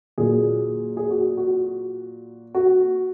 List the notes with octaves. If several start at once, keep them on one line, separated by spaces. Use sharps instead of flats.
A#2 F#3 A#3 G#4
G#4
F#4
F#4
F#4